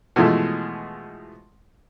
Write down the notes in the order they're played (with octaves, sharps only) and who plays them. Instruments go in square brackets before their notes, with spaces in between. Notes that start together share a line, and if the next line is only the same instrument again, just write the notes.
[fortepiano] B2 E3 F3 G#3 A3